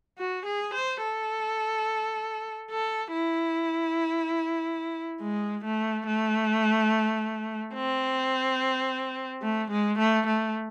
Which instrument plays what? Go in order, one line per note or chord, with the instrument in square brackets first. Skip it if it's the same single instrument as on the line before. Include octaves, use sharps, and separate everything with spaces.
[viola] F#4
G#4
C5
A4
A4
E4
G#3
A3
A3
C4
A3
G#3
A3
A3